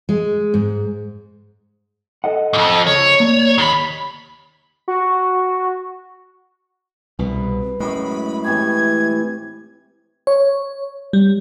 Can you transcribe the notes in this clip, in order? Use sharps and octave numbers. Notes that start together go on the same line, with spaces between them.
G#3
G#2
A4 D#5 F#5
F2 G#2
C#2 C#5
A#3 D5
D#2 D#3 B5
F#4
C2 B2 B4
F#2 A2 G#3 B5
A2 C3 E3 G#6
C#5
G3